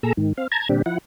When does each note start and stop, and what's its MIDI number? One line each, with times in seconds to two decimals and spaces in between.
0.03 0.13 46
0.03 0.13 68
0.03 0.13 69
0.03 0.13 82
0.03 0.13 88
0.17 0.33 44
0.17 0.33 51
0.37 0.47 60
0.37 0.47 77
0.52 0.68 81
0.52 0.68 82
0.52 0.68 92
0.69 0.82 46
0.69 0.82 50
0.69 0.82 55
0.69 0.82 60
0.69 0.82 62
0.69 0.82 67
0.86 0.98 53
0.86 0.98 64
0.86 0.98 78